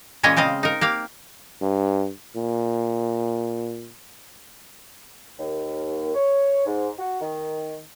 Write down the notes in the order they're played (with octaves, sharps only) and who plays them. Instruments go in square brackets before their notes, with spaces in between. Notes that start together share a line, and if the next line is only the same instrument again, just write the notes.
[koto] A#2 E3 G#3 C#4 C#5 D#5
C#3 C4 D#5 F5
D#4 A#4
A#3 G4 F5
[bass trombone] G2
A#2
[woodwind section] D#2
C#5
G#2
F#4
D#3